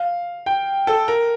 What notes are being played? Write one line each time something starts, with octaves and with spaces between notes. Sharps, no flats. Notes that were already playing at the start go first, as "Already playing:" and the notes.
Already playing: F5
G5
A4
A#4